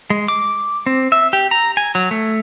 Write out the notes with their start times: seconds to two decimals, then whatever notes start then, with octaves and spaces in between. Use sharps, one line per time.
0.10 G#3
0.28 D6
0.86 C4
1.12 E5
1.33 G4
1.51 A#5
1.77 G#5
1.95 F#3
2.11 A3